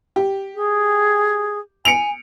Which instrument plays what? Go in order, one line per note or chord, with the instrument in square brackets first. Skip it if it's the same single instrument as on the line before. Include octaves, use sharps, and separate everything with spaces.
[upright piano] G4
[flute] G#4
[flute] G#5 [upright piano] C#7 D7 F7